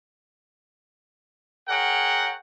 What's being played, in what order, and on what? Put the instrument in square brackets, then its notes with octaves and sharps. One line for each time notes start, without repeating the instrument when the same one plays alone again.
[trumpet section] G#4 A#4 C#5 F#5 G5 A#5